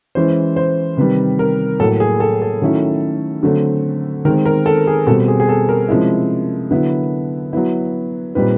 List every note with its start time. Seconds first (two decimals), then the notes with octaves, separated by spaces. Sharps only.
0.15 E3 G#3 C#4 E4 C5
0.56 C5
0.97 C3 D#3 G3 B4
1.39 A#4
1.80 A2 F#3 A#3 A4
2.00 G#4
2.20 A4
2.42 A4
2.62 D#3 F#3 A3 C#4 E4
3.43 D3 F#3 A3 C4
4.25 D#3 G#3 C4 A#4
4.46 A#4
4.66 A4
4.87 G#4
5.07 B2 G3 C4 A4
5.28 G#4
5.40 G#4
5.49 A4
5.69 A#4
5.89 C3 F3 G#3 C#4 E4
6.71 D3 F#3 B3 E4
7.53 F#3 B3 E4
8.35 A#2 G3 C4 D#4 B4